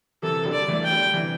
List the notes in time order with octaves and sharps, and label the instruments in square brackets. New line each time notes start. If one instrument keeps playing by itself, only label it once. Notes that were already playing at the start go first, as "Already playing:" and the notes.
[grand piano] C3 E3 [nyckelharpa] A4
[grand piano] D3 G3
[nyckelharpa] D5
[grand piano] E3 A3
[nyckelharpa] G5
[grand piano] D3 G3
C3 E3